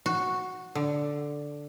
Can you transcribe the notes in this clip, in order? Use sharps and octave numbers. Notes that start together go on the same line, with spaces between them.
F#4
D3